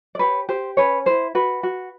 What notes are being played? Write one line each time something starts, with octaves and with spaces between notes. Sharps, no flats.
D5
G4 B4 C#5
G4 C5
C#4 B4 C#5
E4 C5
F#4 B4
F#4